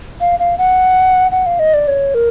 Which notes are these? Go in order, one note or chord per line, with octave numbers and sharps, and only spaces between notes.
F5
F5
F#5
F#5
F5
D#5
D5
C#5
A#4